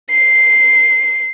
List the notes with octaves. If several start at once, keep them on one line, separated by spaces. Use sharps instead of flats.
C7